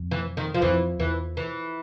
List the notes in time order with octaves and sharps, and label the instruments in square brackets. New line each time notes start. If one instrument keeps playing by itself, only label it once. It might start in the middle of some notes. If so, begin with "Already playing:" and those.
Already playing: [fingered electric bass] F2
[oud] E3
D#3
F3
[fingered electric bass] F2 [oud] E3
[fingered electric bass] E2 [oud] E3
[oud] E3